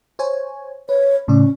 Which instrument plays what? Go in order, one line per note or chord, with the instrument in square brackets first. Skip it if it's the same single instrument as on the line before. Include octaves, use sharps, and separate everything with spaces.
[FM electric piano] C5 C#5 G#5
[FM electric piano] B4 [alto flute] C#5
[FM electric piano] A2 C#3 D5 [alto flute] C#4